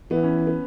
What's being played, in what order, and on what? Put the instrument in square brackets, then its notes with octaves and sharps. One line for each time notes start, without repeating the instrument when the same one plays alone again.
[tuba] E3 [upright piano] B3
[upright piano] C#4
B3